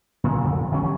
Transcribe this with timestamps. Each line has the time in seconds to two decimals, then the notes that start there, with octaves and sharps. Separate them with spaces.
0.24 A#2 C#3
0.44 F2 D3
0.71 G1 E3 F#3 C#4